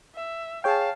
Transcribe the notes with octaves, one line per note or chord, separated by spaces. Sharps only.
E5
G#4 C#5 F5 G5 A5